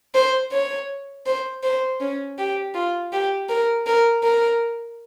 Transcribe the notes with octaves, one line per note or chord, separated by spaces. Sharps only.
C5
C#5
C5
C5
C#4
G4
F4
G4
A#4
A#4
A#4